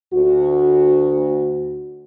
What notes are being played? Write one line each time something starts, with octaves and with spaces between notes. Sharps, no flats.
D2 F#4